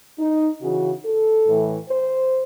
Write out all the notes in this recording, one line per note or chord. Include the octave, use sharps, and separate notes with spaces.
D#4
C#3 E3 F#4
A4
A2 E3
C5